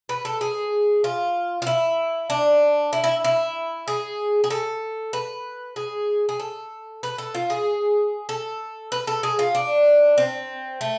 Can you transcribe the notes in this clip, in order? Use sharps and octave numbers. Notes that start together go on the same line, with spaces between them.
B4
A4
G#4
F4
F4
E4
D4
E4
E4
E4
G#4
G#4
A4
B4
G#4
G#4
A4
B4
A4
F4
G#4
A4
B4
A4
G#4
F4
D4
C4
A3